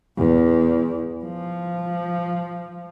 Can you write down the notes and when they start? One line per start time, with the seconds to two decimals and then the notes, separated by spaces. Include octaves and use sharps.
0.17 E2
1.25 F3